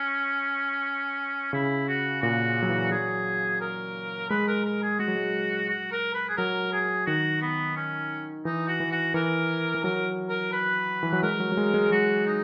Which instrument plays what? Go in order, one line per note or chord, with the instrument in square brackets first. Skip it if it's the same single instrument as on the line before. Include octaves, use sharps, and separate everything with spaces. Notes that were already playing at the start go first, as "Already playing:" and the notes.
Already playing: [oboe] C#4
[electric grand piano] C#3 [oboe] E4
[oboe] F#4
[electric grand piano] A#2 [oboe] F#4
[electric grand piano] F#3
E3
[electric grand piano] F#3 [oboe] G#4
[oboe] A#4
[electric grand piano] G#3 [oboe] B4
[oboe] A#4
A#4
G#4
[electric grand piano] G#3 [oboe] F#4
[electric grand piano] F#3
G#3
[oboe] F#4
A#4
B4
G#4
[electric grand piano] F#3 [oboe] A#4
[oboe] G#4
[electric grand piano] D#3 [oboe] F#4
[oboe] B3
C#4
[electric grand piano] E3 [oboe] D#4
[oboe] F#4
[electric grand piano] E3
[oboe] F#4
[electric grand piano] E3 [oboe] A#4
[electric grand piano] E3
[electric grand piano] F#3 [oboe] A#4
[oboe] A#4
B4
[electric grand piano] E3
F#3
[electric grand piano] G#3 [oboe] A#4
[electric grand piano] F#3
F#3
G#3
G#3
[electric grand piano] F#3 [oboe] F#4
[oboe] D#4